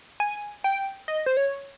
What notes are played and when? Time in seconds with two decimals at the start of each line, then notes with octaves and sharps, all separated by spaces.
0.20 G#5
0.64 G5
1.08 D#5
1.26 C5
1.37 C#5